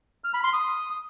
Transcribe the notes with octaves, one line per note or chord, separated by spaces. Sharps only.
F6
B5
C6
D#6